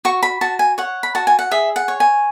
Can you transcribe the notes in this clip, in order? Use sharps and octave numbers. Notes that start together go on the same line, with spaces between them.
F#4 C#6
B5
F#4 A5
G#5
C#5 F#5
B5
F#4 A5
G#5
F#5
G#4 E5
F#5
C#5
G#5